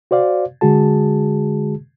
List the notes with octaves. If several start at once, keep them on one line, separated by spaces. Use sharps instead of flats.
F#4 C5 D5 F5
D3 G#3 F#4 G#4 A5